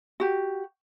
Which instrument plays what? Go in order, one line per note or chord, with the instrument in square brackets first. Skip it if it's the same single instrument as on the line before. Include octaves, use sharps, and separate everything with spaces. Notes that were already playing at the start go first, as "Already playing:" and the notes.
[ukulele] F#4 G4